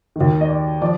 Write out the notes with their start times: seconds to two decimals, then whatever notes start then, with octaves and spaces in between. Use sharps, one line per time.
0.16 D#2 D#3
0.41 D#5
0.49 D5
0.82 F3 D5